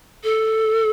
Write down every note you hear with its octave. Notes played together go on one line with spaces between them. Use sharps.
A4